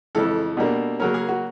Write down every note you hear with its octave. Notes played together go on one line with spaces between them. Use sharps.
F2 C#3 E3 G#3 A4
B2 G3 A#3 D4
C#3 F#3 A#3 C#4 A#4
G#4
F#4